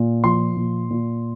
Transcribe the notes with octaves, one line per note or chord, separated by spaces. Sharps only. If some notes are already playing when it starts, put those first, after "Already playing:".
Already playing: A#2
F3 C6
A#2
A#2